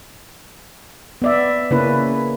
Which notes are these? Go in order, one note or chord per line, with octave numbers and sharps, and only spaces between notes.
B3 D5 E5
C#3 A#3 C#4 E4 B4